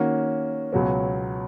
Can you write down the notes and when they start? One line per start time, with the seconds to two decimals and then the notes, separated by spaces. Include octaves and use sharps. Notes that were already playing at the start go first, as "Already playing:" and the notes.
Already playing: D#3 A#3 C#4 F#4
0.73 C#2 B2 F#3 C#4